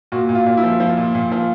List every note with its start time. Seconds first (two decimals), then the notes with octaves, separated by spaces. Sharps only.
0.12 A#2 F#4
0.29 A#2
0.35 F4
0.46 A#2
0.57 E4
0.63 F3
0.80 F3
0.97 A#2
1.15 A#2
1.32 F3